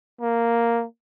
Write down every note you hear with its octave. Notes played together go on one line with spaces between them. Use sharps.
A#3